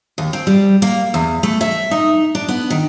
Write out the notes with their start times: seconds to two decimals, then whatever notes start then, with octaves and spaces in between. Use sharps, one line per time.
0.18 D#2
0.33 C4
0.47 G3
0.82 A#3
1.14 E2
1.43 A3
1.61 E5
1.91 D#4
2.35 D4
2.48 B3
2.70 D#3